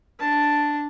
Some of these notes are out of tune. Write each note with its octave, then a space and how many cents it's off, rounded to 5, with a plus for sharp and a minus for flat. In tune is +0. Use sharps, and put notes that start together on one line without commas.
D4 +0 A5 +0